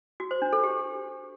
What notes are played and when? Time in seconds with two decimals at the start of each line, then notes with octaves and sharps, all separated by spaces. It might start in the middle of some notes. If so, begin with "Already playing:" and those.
0.20 F#4
0.31 C5
0.42 D4
0.53 A4
0.64 G4